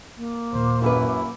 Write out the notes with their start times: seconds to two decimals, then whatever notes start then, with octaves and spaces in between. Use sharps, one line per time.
0.16 A#3
0.53 D#2 A#2 C5
0.82 F#2 E4 F#4 B4